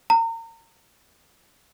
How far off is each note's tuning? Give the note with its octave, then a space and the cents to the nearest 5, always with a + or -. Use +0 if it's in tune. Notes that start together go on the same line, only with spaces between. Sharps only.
A#5 -35